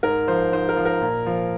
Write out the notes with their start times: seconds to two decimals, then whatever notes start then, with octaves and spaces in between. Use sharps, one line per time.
0.03 G#2 A#4
0.28 F3 C5
0.52 G#2 C5
0.69 A#4
0.77 F3
0.85 A#4
1.02 A#2
1.26 F3